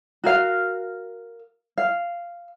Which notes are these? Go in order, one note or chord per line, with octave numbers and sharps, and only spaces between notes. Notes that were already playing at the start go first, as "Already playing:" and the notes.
F#4 A#4 F5
F5